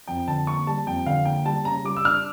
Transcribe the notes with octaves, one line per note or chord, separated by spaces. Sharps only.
F2 G5
D3 A5
A#3 C#6
G3 A5
F2 G5
D3 F5
A#3 G5
G3 A5
C#3 A#5
G3 D6
E6
D4 F6